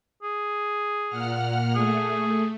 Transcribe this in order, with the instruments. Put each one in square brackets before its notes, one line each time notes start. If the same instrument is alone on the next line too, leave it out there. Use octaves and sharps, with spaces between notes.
[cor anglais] G#4
[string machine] A#2 F#5 F6
[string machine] A3 [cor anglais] G#4